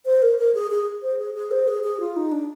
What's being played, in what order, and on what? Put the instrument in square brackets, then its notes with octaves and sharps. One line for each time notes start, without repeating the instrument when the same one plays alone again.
[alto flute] C5
A#4
A#4
G#4
G#4
C5
G#4
G#4
C5
G#4
G#4
F4
D#4
D4